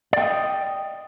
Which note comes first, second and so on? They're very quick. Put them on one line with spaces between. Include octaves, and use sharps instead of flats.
D5 G5 D#5